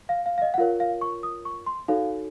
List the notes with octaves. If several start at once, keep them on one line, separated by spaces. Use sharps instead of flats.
F5
F5
F5
D#5
F#5
F4 A#4 C#5 F5
F5
C#6
D#6
C#6
C6
D#4 F#4 A4 C#5 F5